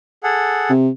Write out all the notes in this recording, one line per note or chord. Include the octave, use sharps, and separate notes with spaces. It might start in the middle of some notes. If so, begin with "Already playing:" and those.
G#4 A4 F#5
C3